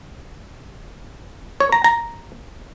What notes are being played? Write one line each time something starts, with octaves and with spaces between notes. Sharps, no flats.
C#5
A#5
A#5